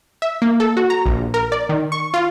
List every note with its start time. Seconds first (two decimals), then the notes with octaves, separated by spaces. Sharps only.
0.22 E5
0.42 A#3
0.60 A4
0.77 F#4
0.90 A#5
1.06 A#1
1.34 A#4
1.52 D5
1.69 D#3
1.92 C#6
2.14 F4